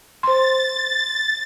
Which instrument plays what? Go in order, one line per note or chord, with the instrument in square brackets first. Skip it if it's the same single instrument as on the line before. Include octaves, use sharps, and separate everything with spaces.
[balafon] C5 C6 [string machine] A6